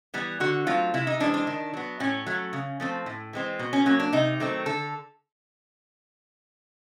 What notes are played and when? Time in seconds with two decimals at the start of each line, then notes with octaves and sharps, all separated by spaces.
0.14 E3 G3 B3
0.40 D3 F#4
0.67 F#3 A3 C4 F4
0.94 C3 E4
1.07 D#4
1.20 E3 G#3 C4 D4
1.34 D4
1.47 D#3
1.74 F#3 B3
2.00 A2 C#4
2.26 F#3 A3
2.53 C#3
2.80 F3 A3 C4
3.06 A2
3.33 E3 G#3 C4
3.59 B2
3.73 C#4
3.86 F#3 A#3 C#4
4.00 D4
4.13 C3 D#4
4.40 D#3 F#3 A3 C4
4.66 D3 A4